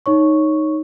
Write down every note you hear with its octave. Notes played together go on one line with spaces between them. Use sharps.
D#4 C#5 C#6